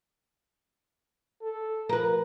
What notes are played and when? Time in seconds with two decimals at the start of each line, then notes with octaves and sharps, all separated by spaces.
1.42 A4
1.89 F3 A#4 B4